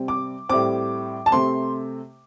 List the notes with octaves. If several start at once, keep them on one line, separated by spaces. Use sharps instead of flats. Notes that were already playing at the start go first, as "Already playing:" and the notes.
Already playing: C3 G3 C4
D6
A2 G3 C4 D6
A5
C3 A3 C4 C6